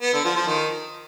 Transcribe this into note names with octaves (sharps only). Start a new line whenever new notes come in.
B3
D3
F3
F3
D#3